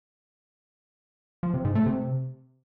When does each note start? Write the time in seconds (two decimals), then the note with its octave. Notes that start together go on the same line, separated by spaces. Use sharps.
1.43 F3
1.54 C3
1.65 G#2
1.75 A3
1.86 C3